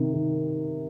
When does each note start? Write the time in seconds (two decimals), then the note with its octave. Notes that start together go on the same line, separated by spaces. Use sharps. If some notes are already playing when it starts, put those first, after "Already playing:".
Already playing: C3 D#3
0.13 D#3